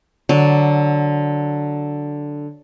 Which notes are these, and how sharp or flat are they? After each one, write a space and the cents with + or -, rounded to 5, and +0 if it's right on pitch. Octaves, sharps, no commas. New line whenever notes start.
D3 +0 F#3 +5 D5 +0